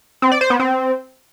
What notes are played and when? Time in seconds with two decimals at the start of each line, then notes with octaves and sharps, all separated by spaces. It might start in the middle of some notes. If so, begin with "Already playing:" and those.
0.22 C4
0.32 D5
0.41 C5
0.50 B3
0.60 C4